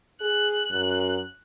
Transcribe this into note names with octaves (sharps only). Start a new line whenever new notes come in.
G#4 F#6
F#2